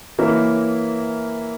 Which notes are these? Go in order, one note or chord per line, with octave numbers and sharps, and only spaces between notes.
E3 A#3 E4 A#4 C#5